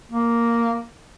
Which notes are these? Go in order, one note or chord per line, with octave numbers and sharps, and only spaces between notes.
A#3